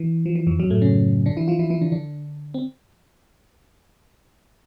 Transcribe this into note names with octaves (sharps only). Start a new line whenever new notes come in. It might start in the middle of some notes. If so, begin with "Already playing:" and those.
Already playing: E3
F3
E3
F2 F3
F#2 F#3
A2 A3
C#3 C#4
D3 D4
E3 E4
F3 F4
E3 E4
E3 E4
D3 D4
D3 D4
C4